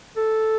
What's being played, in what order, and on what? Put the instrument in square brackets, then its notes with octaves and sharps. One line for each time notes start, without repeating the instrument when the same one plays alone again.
[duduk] A4